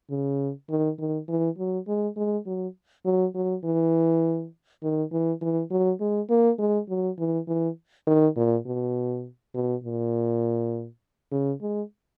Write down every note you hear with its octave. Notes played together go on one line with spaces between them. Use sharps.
C#3
D#3
D#3
E3
F#3
G#3
G#3
F#3
F#3
F#3
E3
D#3
E3
E3
F#3
G#3
A#3
G#3
F#3
E3
E3
D#3
A#2
B2
B2
A#2
C#3
G#3